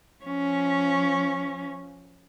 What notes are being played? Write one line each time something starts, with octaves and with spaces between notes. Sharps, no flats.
F3 C#4